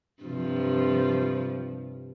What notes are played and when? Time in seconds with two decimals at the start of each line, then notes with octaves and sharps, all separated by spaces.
0.23 G2 C3 F3